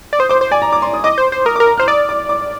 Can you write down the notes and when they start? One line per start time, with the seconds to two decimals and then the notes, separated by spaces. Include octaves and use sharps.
0.13 D5
0.19 C5 D#6
0.29 C5 D6
0.41 C5
0.51 D5 G#5
0.62 A#5
0.72 D6
0.82 C6
0.94 D#6
1.04 D#5 D6
1.18 C5
1.32 C5
1.45 A#4 D#6
1.56 D6
1.60 A#4
1.67 A#5
1.78 C5 F6
1.88 D5 D#6
2.09 D6
2.29 D6